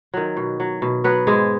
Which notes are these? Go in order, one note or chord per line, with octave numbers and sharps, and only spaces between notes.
D#3 F#3
B2
F#3
B2
F#3 B3 B4
G#2 G#3 G#4